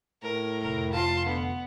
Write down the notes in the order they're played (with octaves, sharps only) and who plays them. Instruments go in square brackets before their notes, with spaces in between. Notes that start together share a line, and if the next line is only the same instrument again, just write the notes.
[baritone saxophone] A2 [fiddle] A#4
[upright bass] F1 [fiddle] A#4
[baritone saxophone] F4 [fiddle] A5 C6
[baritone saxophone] D3 [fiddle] B3